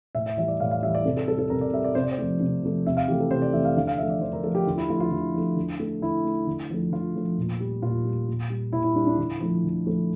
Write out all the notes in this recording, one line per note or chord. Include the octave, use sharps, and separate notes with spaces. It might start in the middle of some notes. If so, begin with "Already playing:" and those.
A2 E5
E5
E3 G3 E5
D5
A2 F5
F5
E3 G3 E5
D5
C3 A4
A4
G3 A4
A4
C3 A#4
D5
G3 E5
D5
C3 C5
D5
C5
F3 A3
C3
F3 A3
C3 E5
F5
E3 A3 G4
A4
C3 C5
D5
E3 A3 E5
F5
D3 F5
F5
F3 A3 E5
D5
D3 C5
A#4
F3 A3 A4
G4
D3 F4
E4
F3 A3 F4
F4
D3 E4
F3 A3
D3
A3
D3 E4
A3
D3
F3 A3
D3 F4
F3 A3
A#2
G3
A#2 F4
G3
A#2
G3
A#2 E4
E4
G3 D4
D4
D3 E4
F3 A3
D3
F3 A3